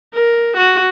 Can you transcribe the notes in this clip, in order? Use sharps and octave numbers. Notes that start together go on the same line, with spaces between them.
A#4
F#4